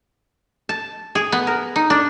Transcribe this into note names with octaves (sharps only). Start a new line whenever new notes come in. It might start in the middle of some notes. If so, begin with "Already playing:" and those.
A5
G#4
B3
A#4
D#4
D4